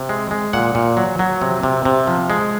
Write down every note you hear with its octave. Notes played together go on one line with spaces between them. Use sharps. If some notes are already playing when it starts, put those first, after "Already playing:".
Already playing: C3
G#3
G#3
A#2 F#5
A#2
F#3
F#3
C3
C3
C3
F3
G#3